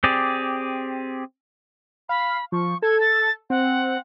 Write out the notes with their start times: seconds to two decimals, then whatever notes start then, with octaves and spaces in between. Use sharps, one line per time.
0.04 C4 G4 G#4 D5
2.09 F5 B5
2.52 F3 C#6
2.82 A4 G#6
3.01 A6
3.50 C4 F#5